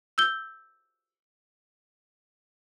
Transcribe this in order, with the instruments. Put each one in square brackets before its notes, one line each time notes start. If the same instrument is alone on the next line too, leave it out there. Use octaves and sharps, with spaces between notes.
[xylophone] E6 G6 G7